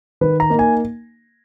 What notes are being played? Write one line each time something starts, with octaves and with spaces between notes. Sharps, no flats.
D#3 B4
A#5
A#3 D#4
G#5